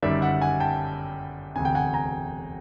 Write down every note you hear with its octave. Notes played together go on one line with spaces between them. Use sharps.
G1 F#2 D#3 G3 D5 E5
E5 F#5
F#5 G#5
G5 A5
E1 D2 C3 G#5
G5
F#5 G#5
G#5 A#5